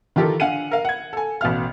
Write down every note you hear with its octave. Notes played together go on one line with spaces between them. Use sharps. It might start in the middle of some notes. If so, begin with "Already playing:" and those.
D#3 E3 F4 G4 A4 A#4
D3 F5 F#5 G#5 D#7
A#4 F5
F#5 G#6
A4 G#5
A1 B2 F5 F6